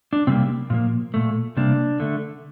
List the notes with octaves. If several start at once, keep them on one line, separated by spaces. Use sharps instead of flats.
D4
C3 G3 A#3 C4
A#2 F3 A#3
A#2 A3
C3 G3 A#3 D4
D3 A3